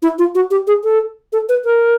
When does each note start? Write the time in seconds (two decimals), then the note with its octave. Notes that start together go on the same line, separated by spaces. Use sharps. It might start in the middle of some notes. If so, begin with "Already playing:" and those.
0.02 E4
0.18 F4
0.35 F#4
0.51 G4
0.67 G#4
0.84 A4
1.33 A4
1.49 B4
1.65 A#4